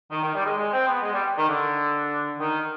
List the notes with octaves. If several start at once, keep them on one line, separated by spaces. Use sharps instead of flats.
D#3
D#3
G3
G#3
G#3
C4
B3
G#3
G3
D#3
D3
D#3